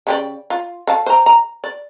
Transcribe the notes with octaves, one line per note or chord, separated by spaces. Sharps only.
C#3 G4 D5
F4
A4 F5 A5
C5 A#5
A#5
D5